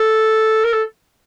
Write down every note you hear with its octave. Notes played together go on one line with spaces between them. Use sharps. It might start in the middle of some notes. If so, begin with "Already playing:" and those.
Already playing: A4
A#4
A4